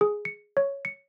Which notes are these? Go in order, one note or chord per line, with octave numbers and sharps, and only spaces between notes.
G#4
C#7
C#5
C#7